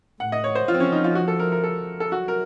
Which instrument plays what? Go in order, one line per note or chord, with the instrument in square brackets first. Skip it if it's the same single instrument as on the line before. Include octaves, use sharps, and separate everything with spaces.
[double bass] A2 [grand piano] F#5
[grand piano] D#5
C#5
C5
[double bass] F3 [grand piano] F4
[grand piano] C4
C#4
D#4
F4
F#4
A4
A#4
A#4
A4
A4
[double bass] F#3 [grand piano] F#4
[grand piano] A#4